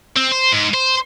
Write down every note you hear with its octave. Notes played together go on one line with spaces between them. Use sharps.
C4
C5
G#2
C5